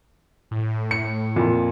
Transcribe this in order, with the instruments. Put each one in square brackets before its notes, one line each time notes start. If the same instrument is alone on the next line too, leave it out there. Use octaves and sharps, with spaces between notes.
[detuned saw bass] A2
[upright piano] C#7
F2 A#2